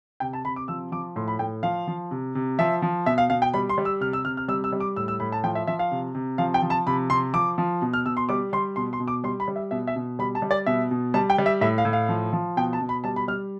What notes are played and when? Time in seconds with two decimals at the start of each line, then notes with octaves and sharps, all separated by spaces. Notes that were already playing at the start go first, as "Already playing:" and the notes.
0.20 C3 G5
0.33 A5
0.45 C3 B5
0.56 D6
0.68 F3 E6
0.92 F3 D6
1.16 A2 C6
1.28 B5
1.39 A2 G5
1.63 F3 F5
1.87 F3
2.11 C3
2.35 C3
2.59 F3 E5
2.82 F3
3.06 B2 E5
3.18 F5
3.30 B2 F5
3.42 G5
3.54 G3 B5
3.69 C6
3.78 G3
3.85 E6
4.01 C3 F6
4.13 E6
4.25 C3 F6
4.37 F6
4.48 G3 E6
4.64 E6
4.72 G3
4.80 D6
4.96 A2 E6
5.08 E6
5.20 A2 B5
5.32 A5
5.43 F3 G5
5.55 E5
5.67 F3 E5
5.79 F5
5.91 C3
6.15 C3
6.38 F3 F5
6.54 G5
6.62 F3
6.70 A5
6.87 C3 B5
7.10 C3 C6
7.34 F3 D6
7.58 F3
7.82 B2
7.94 F6
8.06 B2 E6
8.17 C6
8.29 G3 D6
8.53 G3 C6
8.76 B2 C6
8.93 C6
9.00 B2
9.08 D6
9.24 G3 C6
9.40 B5
9.48 G3
9.56 E5
9.71 B2 E5
9.87 E5
9.96 B2
10.19 G3 B5
10.35 A5
10.42 G3
10.51 D5
10.66 B2 E5
10.91 B2
11.14 G3 A5
11.30 G5
11.38 G3
11.46 E5
11.61 A2 E5
11.78 F5
11.85 A2
11.93 F5
12.09 F3
12.33 F3
12.57 B2 G5
12.73 A5
12.81 B2
12.89 B5
13.04 G3 A5
13.16 B5
13.28 G3 F6